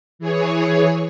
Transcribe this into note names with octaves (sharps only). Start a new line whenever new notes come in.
E3 G#4 C#5